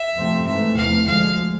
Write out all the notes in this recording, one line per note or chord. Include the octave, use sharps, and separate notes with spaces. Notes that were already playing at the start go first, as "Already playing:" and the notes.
Already playing: E5
F2 C3 F3 A3 C4
G#2 E3 A3 E5
F1 E2 C3 E3 A3 F5
D2 D3 F3 G#3 F5